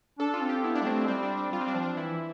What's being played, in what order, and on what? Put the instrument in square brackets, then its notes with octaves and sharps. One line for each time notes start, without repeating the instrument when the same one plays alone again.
[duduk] D4 [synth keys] A4
[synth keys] F4
[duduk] C4
[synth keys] G4
[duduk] B3 [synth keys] E4
[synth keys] D4
[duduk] G3
[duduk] A3 [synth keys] C4
[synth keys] C4
[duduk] G3 [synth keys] C4
[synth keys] D4
D4
[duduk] G3 [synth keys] F4
[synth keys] C4
[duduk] G3 [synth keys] D4
[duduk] F3
[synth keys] D4
[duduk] E3 [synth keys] E4